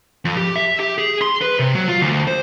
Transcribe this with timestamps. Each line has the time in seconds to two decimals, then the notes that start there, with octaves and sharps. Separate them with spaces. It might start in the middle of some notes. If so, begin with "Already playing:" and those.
0.25 F2
0.37 G4
0.56 E5
0.80 G4
0.98 G#4
1.21 C6
1.41 B4
1.59 C3
1.75 F#3
1.88 F4
2.02 D2
2.28 C5